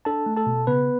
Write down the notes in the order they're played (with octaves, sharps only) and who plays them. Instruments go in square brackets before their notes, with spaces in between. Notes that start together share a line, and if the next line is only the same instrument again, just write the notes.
[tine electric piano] D4 A4 A5
A3
A4 A5
B2
C#3 B3 B4